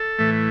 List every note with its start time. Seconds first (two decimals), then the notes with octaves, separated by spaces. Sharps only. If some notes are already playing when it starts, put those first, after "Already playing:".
Already playing: A4
0.19 A2 E3 A3